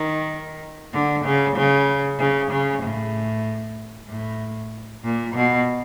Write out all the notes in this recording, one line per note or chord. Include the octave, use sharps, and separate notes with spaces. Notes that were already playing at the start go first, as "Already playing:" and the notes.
Already playing: D#3
D3
C#3
C#3
C#3
C#3
A2
A2
A#2
B2